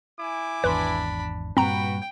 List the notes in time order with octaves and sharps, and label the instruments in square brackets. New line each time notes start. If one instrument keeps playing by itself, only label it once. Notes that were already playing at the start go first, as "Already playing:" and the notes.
[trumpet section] E4 G#5 D6
[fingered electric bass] G#1 E2 [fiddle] D4 B5 [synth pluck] B4 C6
[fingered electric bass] G2 A#2 G3 [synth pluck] C4 A#5 [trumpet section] F#4 B4 [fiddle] G5